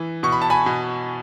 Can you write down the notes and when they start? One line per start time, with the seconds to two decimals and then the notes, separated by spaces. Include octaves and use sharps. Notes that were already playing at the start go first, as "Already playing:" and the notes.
Already playing: E3
0.23 B2 C#6
0.32 B5
0.42 A5
0.50 G#5 B5
0.66 B2